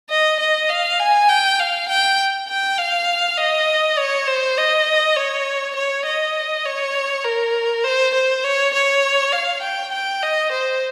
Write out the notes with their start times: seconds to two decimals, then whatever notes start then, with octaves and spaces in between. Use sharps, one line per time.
0.10 D#5
0.40 D#5
0.69 F5
1.00 G#5
1.29 G5
1.60 F5
1.89 G5
2.49 G5
2.79 F5
3.38 D#5
3.98 C#5
4.27 C5
4.57 D#5
5.16 C#5
5.75 C#5
6.06 D#5
6.65 C#5
7.25 A#4
7.84 C5
8.14 C5
8.44 C#5
8.74 C#5
9.32 F5
9.62 G5
9.92 G5
10.23 D#5
10.52 C5